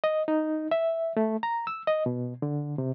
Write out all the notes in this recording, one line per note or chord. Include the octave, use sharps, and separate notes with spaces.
D#5
D#4
E5
A3
A#5
E6
D#5
B2
D3
C3